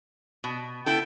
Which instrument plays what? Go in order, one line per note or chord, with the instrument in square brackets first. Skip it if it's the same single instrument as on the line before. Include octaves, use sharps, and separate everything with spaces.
[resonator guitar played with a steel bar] B2
[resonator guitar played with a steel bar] B3 E4 A4 [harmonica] G5